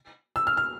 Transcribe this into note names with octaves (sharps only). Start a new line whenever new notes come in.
E6
F6
F6